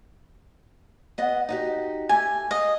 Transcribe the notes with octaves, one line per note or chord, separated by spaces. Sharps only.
B3 D#5 F#5
D#4 F#4 G4
A3 G4 G#5
D#5 F5